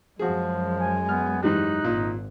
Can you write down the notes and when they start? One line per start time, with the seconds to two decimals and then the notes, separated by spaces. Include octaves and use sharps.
0.19 F#2 F3 G#3 F#4 G#4
0.79 G#5
1.09 B3 F6
1.43 G#2 E3 G3 D#4 F#6
1.85 G#1 A#2